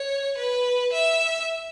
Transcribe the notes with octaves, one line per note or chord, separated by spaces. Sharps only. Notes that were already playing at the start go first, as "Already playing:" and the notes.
Already playing: C#5
B4
E5